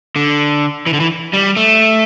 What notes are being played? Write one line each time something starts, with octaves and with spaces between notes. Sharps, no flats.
D3
E3
D3
E3
G3
A3